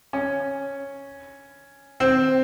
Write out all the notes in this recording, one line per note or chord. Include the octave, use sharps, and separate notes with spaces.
C#4
C4